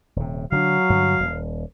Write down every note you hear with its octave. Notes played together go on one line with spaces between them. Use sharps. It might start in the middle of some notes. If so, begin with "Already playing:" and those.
D#1 C3
D3 F#3 C4 D4 F5
G2 D3
D#1